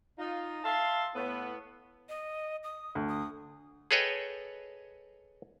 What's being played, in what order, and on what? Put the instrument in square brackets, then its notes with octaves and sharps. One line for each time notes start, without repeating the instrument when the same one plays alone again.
[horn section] D#4 F4
E5 F5 A5 C6
A2 B3
[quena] D#5
D#6
[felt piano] D2
[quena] D#6
[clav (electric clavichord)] G#4 A4 B4 C#5 D#5 G5